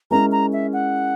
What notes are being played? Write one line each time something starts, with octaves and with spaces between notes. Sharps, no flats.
G#3 C#4 E4 A#4 A#5
A#5
E5
F#5